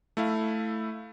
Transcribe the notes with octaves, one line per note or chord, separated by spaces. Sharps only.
A3 E4 F5